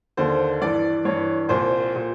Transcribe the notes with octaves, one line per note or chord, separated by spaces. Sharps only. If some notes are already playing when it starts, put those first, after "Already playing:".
D#2 D3 C5
G2 E3 D5
G2 E3 C#5
C2 A#2 C5
A#2